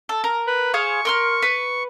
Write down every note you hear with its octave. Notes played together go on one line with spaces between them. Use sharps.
A4
A#4
B4
G#4 C5 F5 C#6
A#4 C6 F6
B4